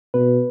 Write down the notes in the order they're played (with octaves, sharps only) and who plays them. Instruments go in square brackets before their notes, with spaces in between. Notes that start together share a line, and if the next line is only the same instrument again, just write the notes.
[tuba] B2 [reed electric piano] B4